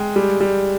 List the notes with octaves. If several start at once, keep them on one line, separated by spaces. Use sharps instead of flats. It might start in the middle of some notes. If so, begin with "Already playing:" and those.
Already playing: G#3 G5
G3
G3